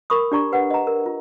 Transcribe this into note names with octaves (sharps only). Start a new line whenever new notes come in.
A#4 B5 C#6 D#6
D4 G4 D5 A#5 C#6
G4 B4 F#5
D#5 A#5
A#4
F4